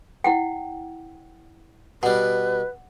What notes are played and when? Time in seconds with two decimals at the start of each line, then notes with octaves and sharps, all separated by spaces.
0.24 E4 F#5 G5
2.03 B2 G3 B4 F#5